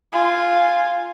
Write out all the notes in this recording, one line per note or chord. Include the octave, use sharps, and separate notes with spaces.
F4 G#5